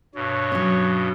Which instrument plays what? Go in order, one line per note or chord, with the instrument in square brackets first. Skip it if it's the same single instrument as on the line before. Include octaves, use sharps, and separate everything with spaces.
[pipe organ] G2 B2 [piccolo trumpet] C#5
[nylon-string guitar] F#3 C#4